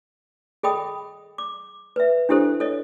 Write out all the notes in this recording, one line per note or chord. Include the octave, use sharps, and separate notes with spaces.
G#4 A4 D#5 G5 B5 D#6
D6
B4 E5
D4 E4 G4 A4 C5
A4 C#5 D#5